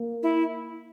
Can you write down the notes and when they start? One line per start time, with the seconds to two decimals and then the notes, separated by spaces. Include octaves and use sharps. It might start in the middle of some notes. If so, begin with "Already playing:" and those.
Already playing: A#3
0.23 E4